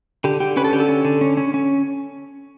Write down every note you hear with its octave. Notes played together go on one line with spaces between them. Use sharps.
D3 G4
D3 G4
C#4 B4
A4
D3 G4
A4
C#4
D3
C#4
C#4
C#4